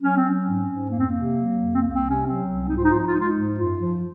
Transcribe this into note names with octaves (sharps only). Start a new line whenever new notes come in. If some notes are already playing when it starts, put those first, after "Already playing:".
F#3 C#4
C4
F#3 C#4
G#2
G#2
F2 A#3
C4
A#3
C3
F#3
F2
C4
C2 A#3
A#3
C4
C3
C#4
F#3 C4
C2
G#2 D#4
F4
D#4
F3 F4
D#4
F4
G#3 D#4
F4
D#4
G#2
F#2 F4
F3